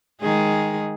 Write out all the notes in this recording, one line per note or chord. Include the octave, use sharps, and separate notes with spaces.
D#3 G#3 G#4